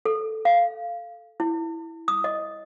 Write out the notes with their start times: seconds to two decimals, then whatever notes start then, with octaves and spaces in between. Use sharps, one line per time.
0.05 A4
0.45 F5
1.40 E4
2.08 D#6
2.24 D#5